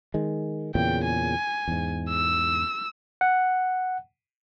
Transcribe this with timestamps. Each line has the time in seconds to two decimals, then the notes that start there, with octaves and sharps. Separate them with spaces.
0.14 D#3 G#3
0.75 E2 A#2 C#3 G5
1.04 G#5
1.68 E2 G#2
2.10 E6
3.21 F#5